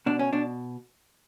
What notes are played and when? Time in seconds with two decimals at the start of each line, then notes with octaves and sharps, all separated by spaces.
0.06 B2 D4
0.19 C#4
0.33 B2 D4